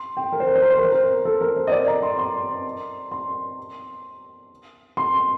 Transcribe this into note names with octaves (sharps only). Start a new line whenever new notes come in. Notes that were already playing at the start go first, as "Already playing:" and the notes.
Already playing: C6
G5
A#4
C5
A#4
C5
A#4
C5
A#4
C5
A#4
A4
A#4
C5
D#5
D5
A#5
C6
C6
C6
C6